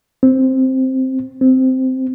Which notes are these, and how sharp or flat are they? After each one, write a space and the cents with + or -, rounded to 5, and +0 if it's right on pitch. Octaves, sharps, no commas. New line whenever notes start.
C4 +0
C4 -10